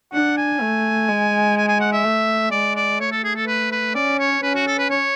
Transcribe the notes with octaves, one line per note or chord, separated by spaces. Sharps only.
D4 F#5
G#5
A3
G#3
G#5
G#5
F#5
E5
A3
G#3 D5
D5
A3 C#5
A4
G#4
A4
B4
B4
C#4 D5
C#5
C#4 B4
F#4
A4
B4
C#5